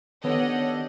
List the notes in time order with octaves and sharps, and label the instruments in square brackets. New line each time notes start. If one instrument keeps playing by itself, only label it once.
[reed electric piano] D#3 B3 [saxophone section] D4 A4 [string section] G4 D#5 F#5 [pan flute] C#5